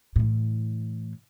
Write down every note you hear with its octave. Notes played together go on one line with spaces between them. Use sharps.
A2 E3